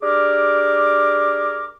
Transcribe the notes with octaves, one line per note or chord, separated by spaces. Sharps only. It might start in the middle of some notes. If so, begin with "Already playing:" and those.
D4 G4 G#4 A#4 D6